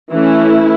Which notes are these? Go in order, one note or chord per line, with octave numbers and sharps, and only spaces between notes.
E3 A3 C#4 E4